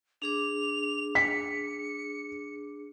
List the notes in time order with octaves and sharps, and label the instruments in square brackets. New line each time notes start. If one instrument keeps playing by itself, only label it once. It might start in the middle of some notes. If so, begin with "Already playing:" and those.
[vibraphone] D4 G#4 D6 [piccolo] F7
[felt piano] B6 [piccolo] C#7